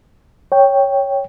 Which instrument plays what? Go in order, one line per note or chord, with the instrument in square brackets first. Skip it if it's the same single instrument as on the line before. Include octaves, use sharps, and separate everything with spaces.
[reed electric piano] C#5 G5